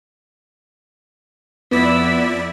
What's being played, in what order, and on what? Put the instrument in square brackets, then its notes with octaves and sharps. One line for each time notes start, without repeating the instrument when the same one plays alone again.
[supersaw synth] F2 D5 [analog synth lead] B3 [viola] E4